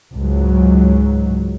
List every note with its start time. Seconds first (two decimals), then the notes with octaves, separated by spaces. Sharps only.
0.15 C#2 G#2 F#3